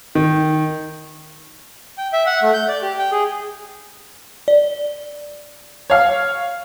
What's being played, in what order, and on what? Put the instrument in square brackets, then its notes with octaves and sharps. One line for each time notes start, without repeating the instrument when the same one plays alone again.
[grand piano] D#3
[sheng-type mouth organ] G5
E5
F#5
A3
G6
D5
G4
G5
G#4
[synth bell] D5
[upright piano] C#5 F5